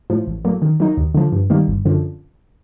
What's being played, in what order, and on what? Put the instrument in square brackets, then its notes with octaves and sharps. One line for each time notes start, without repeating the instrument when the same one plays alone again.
[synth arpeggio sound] A2 F3
A1
A2 F#3 A#3
D#3
F#3 A#3 D#4
D#2
D3 F3
G2
D#3 G3 A#3
G1
F#2 D3 F3